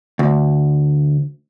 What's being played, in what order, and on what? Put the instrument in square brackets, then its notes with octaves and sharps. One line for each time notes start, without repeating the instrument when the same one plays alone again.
[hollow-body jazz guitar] D2